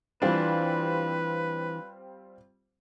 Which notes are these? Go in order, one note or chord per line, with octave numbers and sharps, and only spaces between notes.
E3 G3 C4 D4 F4 B4